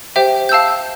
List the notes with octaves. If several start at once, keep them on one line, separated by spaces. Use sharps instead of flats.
G4 C5 E5 G5
F5 A5 E6 G6